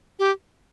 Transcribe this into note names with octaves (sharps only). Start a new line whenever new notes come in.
G4